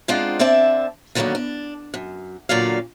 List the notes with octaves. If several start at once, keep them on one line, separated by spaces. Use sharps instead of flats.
G#3 C4 D4 D#4 F4 F#5
D3 C4 D5 E5 A5
D3 D#3 F#3 G3 A#3 B3
D4
F#2
A#2 D3 F#3 D5 F5